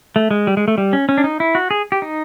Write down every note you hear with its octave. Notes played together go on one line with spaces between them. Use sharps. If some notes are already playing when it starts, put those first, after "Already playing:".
A3
G#3
G3
G#3
A3
G3
C#4
C#4
D4
D#4
E4
F#4
G#4
G4
D#4